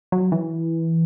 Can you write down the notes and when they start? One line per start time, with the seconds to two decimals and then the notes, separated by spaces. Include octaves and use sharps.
0.12 F#3
0.32 E3